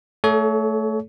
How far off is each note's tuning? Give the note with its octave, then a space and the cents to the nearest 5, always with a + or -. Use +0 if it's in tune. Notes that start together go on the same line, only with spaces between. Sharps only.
A3 +5 A4 -35 C#5 +25